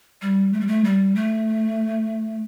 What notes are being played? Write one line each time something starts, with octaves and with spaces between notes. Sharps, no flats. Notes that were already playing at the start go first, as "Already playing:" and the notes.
G3
A3
G3
A3
G3
A3